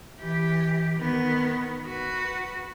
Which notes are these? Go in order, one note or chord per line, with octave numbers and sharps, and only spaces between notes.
E3 G4
D#3 B3
F#4 B4